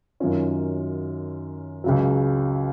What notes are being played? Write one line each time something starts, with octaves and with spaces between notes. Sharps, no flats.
F#2 D#3 F#3 C#4 F4
C#2 C#3 F#3